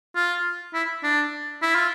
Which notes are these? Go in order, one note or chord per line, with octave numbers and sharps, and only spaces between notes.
F4
E4
D4
E4
F4